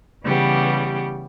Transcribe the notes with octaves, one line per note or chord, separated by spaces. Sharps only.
C#3 E3 G3 B3 G4